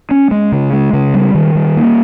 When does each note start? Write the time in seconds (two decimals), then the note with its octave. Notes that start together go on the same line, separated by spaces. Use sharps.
0.11 C#4
0.31 G#3
0.52 C#3
0.73 G#3
0.93 C#3
1.14 G3
1.35 D#3
1.55 G3
1.77 A#3